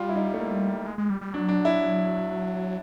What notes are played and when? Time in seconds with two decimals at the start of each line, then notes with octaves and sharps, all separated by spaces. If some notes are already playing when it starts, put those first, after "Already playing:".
Already playing: G3 F4
0.09 E4
0.16 D#4
0.34 A3
0.39 A#3
0.87 G#3
0.98 G#3
1.10 G3
1.21 G3
1.33 F#3 D4
1.49 D4
1.65 E4